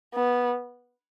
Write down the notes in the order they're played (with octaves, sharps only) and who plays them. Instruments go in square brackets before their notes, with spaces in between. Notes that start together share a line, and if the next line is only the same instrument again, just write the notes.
[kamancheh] B3